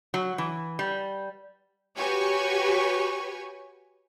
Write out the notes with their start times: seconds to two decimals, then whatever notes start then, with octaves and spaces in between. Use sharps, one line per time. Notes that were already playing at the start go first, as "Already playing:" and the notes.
0.14 F#3
0.38 E3
0.79 G3
1.97 F#4 G4 B4 C#5 G#5 C#6